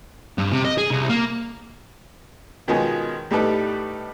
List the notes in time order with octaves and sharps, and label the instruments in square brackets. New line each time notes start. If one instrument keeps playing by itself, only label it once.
[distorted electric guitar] G2
C3
D#5
G#4
C2
A#3
[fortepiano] B2 D#3 F3 G#3 B3 C#4
A2 G3 D#4 G4 A4 B4